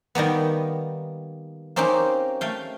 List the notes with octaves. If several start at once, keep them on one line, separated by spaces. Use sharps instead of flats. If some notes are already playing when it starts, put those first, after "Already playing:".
D#3 G3 A#3 B3
A#3 C4 C#4 D#4 G4
A3 F5 G5